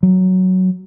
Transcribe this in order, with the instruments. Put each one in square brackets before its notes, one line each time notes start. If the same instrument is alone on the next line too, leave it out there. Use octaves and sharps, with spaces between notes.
[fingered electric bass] F#3